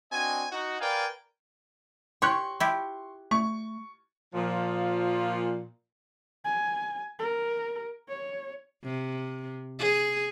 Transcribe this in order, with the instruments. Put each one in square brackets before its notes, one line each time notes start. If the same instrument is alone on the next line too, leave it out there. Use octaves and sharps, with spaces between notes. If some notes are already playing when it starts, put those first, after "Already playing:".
[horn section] C4 D4 F#4 D#5 G#5
D#4 F#4
A#4 B4 D5 F5 G5 G#5
[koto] G4 C#5 [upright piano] C6 C#6 F#6
[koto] E4 F4 G4
[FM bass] A3 [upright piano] C#6
[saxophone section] A#2 F3
[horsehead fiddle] G#5
A#4
C#5
[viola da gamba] C3
G#4